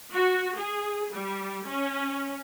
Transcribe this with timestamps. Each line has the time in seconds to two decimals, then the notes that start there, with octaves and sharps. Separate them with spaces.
0.13 F#4
0.57 G#4
1.12 G3
1.66 C#4